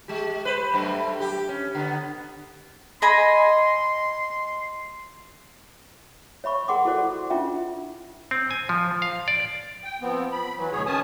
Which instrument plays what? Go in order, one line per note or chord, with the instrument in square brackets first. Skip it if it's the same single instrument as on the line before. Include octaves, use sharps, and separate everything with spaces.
[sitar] G#3 G4
B4 C5
F#2 G3 A3
G4
C#4
D3 B3
[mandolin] D#5 G#5 B5 [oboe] C6
[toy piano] C#5 E5 B5 C#6
G#4 A#4 F#5 G5 C6 D6
E4 F#4 A4 C5 D5 F#5
C#4 D4 E4 F4 E5 G5
[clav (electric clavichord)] C4
G#5
F3
F5
D5
[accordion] G5
F3 B3 C4
B5
E3 F#3
D2 B2 G#4 C#5
D#3 C#4 G#5 A5 D#6